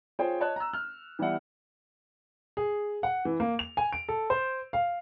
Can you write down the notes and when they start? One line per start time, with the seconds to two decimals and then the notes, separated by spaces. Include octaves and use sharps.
0.19 F4 G#4 C5 C#5 G5
0.41 C#5 D#5 A5 F#6
0.56 A#5 E6
0.73 F6
1.19 E3 G3 B3 E5 F#5
2.57 G#4
3.03 F#5
3.25 E3
3.40 A#3
3.59 F7
3.77 G#5
3.93 D7
4.09 A4
4.30 C5
4.73 F5